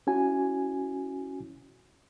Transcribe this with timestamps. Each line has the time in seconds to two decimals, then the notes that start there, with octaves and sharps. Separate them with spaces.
0.07 C#4 E4 F#4 G#5